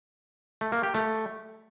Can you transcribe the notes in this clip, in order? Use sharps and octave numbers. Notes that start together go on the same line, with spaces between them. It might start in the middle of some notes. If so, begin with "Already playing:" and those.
A3
A#3
G4
A3